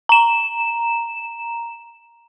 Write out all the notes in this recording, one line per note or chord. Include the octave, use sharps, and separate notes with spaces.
A#5 E7